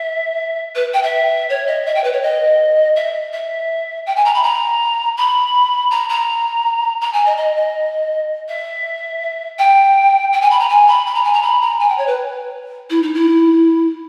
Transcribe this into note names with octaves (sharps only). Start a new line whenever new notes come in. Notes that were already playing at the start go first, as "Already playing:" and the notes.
Already playing: E5
B4
G5
E5
C#5
D#5
E5
G5
B4
C#5
D#5
E5
E5
G5
G#5
A#5
B5
A#5
B5
A#5
A#5
A#5
G#5
D#5
D#5
D#5
E5
G5
G5
G#5
B5
A#5
G#5
B5
B5
A#5
G#5
A#5
B5
A#5
G#5
G5
C#5
B4
E4
D#4
E4